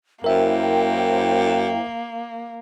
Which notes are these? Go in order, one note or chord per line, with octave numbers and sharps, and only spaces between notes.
F#2 A#3 E4 A#4 C5 E5 G5